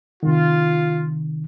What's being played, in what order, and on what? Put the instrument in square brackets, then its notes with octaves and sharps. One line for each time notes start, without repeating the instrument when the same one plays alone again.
[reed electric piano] C3 D#3 [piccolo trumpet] F4